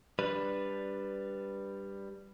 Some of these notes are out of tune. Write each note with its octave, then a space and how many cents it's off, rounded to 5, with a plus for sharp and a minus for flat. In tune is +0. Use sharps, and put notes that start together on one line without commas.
G3 +5 D4 +0 B4 +0